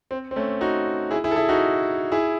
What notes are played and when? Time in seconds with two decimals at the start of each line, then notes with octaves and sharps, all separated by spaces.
0.11 C4
0.31 C4
0.36 A3 C#4
0.61 D#4 F#4
1.11 E4 G#4
1.24 E4 G#4
1.31 A4
1.36 E4 G#4
1.49 D#4 F#4
2.12 E4 G#4